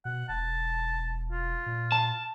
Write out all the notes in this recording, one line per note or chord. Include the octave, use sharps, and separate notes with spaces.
B2 F#5
E1 A5
F4
A#2
A5